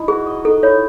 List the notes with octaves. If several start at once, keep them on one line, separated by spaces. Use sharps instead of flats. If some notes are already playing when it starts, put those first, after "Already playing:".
Already playing: D#4 E4
F#4 G#4
D#5
D#4 A4
E4 C#5